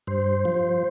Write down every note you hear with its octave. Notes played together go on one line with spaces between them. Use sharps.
G2 C5
F3